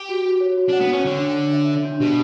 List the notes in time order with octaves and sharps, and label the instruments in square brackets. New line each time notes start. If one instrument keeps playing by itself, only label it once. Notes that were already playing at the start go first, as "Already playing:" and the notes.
Already playing: [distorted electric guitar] G4
[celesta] F#4
F#4
C#5
F#4
[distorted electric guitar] D4 [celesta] F#5
[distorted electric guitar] B3
[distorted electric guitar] C#4 [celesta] C#5
[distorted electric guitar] D3 [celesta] D4
[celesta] D4
D4
E5
E5
D4
[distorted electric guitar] B2 [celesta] G4